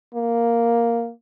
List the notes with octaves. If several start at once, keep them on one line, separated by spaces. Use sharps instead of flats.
A#3